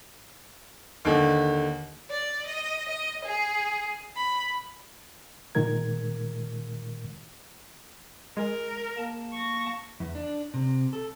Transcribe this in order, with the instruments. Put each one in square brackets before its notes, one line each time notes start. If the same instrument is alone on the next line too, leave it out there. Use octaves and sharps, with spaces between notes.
[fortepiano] D#2 D3
[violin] D5
D#5
D#5
G#4
B5
[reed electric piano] A#2 D#3 G#3 A#4 G#6
[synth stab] G#3 [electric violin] A#4
[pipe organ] A#3 A5
[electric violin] C#6 A#6
[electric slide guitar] E2
D4
C3
A4